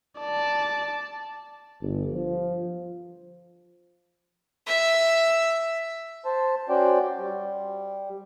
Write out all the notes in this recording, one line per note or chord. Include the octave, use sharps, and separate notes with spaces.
D5 A5
G1
F3
E5
C5 A5
C#4 F#4 C5 D5 G5
G3